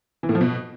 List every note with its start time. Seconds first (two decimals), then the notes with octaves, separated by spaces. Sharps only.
0.23 E3
0.29 A2
0.35 F3
0.41 B2